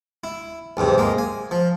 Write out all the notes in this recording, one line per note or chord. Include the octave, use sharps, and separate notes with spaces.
E4
B1 E2 G#2 C3
G#3 A#3
G#5
F3